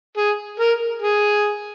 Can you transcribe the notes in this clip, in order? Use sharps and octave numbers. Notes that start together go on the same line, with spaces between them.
G#4
A#4
G#4